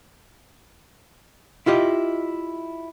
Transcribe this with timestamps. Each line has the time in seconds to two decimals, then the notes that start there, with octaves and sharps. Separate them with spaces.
1.66 E4 F4 G4 D#5